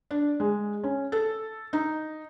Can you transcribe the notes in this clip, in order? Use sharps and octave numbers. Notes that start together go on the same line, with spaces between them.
D4
G#3
C#4
A4
D#4